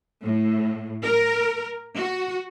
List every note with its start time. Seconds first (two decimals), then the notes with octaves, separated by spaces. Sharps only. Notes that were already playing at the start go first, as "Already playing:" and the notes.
0.23 A2
1.03 A#4
1.96 F#4